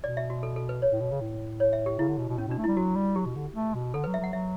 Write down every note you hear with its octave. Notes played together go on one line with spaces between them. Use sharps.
B2 D5
E5
F#4
A4
A4
B4
C#5
A2
B2
C#3
A2
C#5
E5
G4
C#3 E4
D3
B2
B2
A2 C#4
B2 D4
A3
G3 E4
F#3 F#4
G3
F#3 G4
B2
D3
A3
B2
D3 A4
B4
F#3
E5
F#3 F#5
F#3 E5